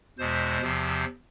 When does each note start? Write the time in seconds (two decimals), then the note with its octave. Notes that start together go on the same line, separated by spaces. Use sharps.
0.18 E2 B2 G#3 C5
0.61 E2 C3 F3